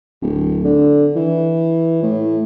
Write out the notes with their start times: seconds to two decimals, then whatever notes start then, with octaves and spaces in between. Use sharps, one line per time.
0.22 D1
0.64 D3
1.15 E3
2.03 A2